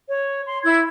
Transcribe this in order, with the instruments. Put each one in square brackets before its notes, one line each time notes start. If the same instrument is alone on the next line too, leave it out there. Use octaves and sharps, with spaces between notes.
[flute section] C#5
C6
E4 E6 G#6